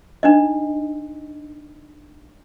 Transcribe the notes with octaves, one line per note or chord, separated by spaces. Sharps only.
D4 D#4 D#5